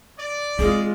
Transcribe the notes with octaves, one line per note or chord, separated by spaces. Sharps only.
D5
G#3 C4 F4 G#4